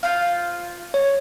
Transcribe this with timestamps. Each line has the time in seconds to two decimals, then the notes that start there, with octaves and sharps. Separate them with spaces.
0.03 F4 C5 F5
0.94 C#5